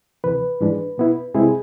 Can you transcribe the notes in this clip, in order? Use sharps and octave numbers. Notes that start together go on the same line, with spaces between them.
D2 C3 E3 B4
G#2 E3 G#3 D4
B2 B3 E4
C2 C3 G#3 C4 E4 G#4